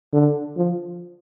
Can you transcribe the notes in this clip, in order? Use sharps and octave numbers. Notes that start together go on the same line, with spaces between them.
D3
F3